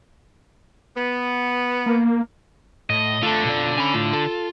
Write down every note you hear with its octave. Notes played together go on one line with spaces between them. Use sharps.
B3
A#3
A2 D#5
D3 A3 F4 A4
B2 D5
C#4 G#5 B5
A2 F4
A4